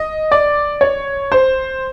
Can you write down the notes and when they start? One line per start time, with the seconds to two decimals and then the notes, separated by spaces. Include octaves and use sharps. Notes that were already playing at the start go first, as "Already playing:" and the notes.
Already playing: D#5
0.32 D5
0.81 C#5
1.32 C5